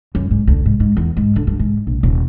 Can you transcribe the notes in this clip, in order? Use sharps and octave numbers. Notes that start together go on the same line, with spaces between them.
F#2
G#2
D2
G#2
G#2
E2
G#2
D3
G2
G#2
A#1
D#1